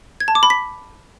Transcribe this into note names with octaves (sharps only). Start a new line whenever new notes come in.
G#6
A5
D6
B5
B6